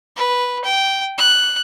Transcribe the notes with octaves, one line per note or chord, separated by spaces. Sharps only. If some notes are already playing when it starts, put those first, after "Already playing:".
B4
G5
F#6